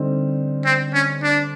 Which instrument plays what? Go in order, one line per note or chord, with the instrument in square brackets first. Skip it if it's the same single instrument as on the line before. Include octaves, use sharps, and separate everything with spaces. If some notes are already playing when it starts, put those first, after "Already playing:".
Already playing: [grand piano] D3 G3 C4 D#4
[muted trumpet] C4
C#4
D4